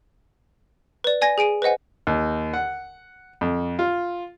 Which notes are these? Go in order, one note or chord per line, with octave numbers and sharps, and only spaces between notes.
B4 D5
D5 G#5 G#6 A#6
G#4 G#5 D7 D#7
B4 C5 D#5 F#5 G#5
D#2
F#5
F2
F4